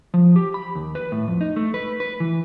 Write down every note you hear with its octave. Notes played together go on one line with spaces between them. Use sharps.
F3
G4
B5
D#2
B4
A2
F2
D#4
A3
B4
B4
E3